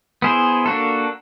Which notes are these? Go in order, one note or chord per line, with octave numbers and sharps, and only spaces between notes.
B3 E4 G#4 C5
A#3 D4 F#4 A4